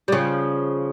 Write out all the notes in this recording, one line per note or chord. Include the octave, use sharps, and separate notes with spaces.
G3
C#3 F3